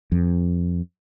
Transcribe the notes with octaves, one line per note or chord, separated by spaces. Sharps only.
F2